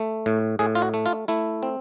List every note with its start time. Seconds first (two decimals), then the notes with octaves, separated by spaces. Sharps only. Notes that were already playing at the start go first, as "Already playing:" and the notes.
Already playing: A3
0.26 A2
0.59 A2 G#4
0.75 F4
0.82 F#4
0.94 A3
1.06 F4
1.28 A3 E4
1.63 C4